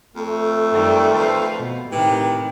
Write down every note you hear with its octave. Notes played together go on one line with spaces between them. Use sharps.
F2 A3
F#2 D#3 G3
B4 C5 F5
B2
A2 C3 D#3 E3 G4